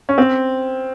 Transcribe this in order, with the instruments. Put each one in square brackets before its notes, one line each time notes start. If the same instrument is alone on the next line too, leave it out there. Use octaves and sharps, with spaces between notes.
[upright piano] C#4
C4